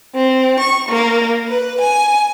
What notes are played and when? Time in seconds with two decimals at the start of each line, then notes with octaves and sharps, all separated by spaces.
0.14 C4
0.59 C#6
0.88 A#3
1.48 B4
1.80 G#5